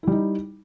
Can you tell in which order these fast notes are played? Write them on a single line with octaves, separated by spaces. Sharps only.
E4 G3 D#4